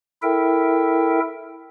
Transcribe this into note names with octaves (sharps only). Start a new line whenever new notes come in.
E4 A4 A#4 E5 G5